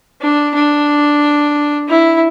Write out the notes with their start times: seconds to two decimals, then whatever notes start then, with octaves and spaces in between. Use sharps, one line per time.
0.22 D4
0.55 D4
1.89 E4